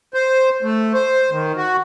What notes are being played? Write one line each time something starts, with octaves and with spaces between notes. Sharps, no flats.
C5
A3
C5
D#3
F#4